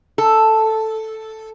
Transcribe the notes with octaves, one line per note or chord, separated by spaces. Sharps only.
A4